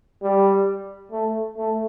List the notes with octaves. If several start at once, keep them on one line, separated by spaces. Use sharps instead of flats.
G3
A3
A3